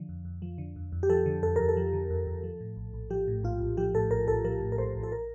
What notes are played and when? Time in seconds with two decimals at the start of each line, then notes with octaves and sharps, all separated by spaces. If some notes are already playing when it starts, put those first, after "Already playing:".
Already playing: D3 F3
0.09 F2
0.25 F2
0.42 F3
0.58 D3
0.76 F2
0.92 F2
1.03 G4
1.10 F3 A4
1.26 D3
1.43 F2 A4
1.56 F2 A#4
1.69 A4
1.77 F3
1.93 D3
2.10 F2
2.27 F2
2.43 F3
2.61 A2
2.77 A#1
2.94 A#1
3.10 F3 G4
3.28 A2
3.43 A#1 F4
3.60 A#1
3.77 F3 G4
3.94 A2 A4
4.11 A#1 A#4
4.28 A#1 A4
4.45 F3 A#4
4.61 A2
4.72 A#4
4.78 A#1 C5
4.95 A#1
5.03 A4
5.12 A#4